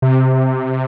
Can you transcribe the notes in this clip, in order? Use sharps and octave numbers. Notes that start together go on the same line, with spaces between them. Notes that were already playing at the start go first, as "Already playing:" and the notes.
C3